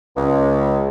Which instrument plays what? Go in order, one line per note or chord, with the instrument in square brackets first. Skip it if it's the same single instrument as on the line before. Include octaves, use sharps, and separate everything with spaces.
[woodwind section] C#2